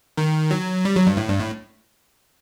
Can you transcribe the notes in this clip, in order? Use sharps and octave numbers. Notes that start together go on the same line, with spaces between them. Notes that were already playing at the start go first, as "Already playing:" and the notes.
D#3
F#3
G3
F#3
G2
A2
G2
A2